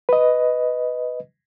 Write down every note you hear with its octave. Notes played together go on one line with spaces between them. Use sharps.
B4 D#5